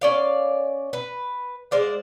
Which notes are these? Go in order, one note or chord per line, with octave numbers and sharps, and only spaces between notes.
C#4 D5 F5
B4
G#3 C5 D5 F5